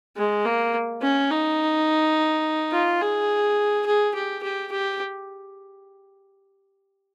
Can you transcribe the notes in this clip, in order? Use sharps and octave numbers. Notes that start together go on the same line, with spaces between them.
G#3
A#3
C#4
D#4
F4
G#4
G#4
G4
G4
G4